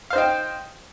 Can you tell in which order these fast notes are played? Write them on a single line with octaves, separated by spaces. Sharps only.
F5 C5 D#4 G5